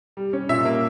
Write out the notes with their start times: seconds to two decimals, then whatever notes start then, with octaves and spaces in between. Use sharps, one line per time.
0.17 G3
0.33 C#4
0.49 A#2 E5
0.65 A#3